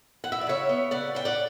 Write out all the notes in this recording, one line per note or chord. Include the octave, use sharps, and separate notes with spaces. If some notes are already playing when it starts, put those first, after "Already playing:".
E3 F#5
E5
D5
C#3 C#5 E5
B3
C#3 D5 F#5
C#3 G5
D5 F#5